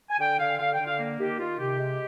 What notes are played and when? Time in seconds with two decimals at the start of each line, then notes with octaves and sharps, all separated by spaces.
0.10 G#5
0.20 D3 G5
0.39 D3 F5
0.59 D3 F5
0.73 G5
0.79 D3
0.86 F5
0.99 A#3
1.19 D#3 G4
1.39 D#3 F4
1.59 C3 G4
1.79 G#3